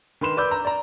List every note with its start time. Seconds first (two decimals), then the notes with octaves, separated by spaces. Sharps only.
0.21 D#3 B4 C6 E7
0.37 B4 D5 B5 D6 E6 G6
0.51 A#5
0.65 D5 A#5